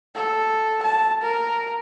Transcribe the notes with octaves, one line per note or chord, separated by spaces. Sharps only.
A4
A5
A#4